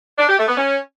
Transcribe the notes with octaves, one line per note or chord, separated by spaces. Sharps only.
D4
G4
A3
B3
C#4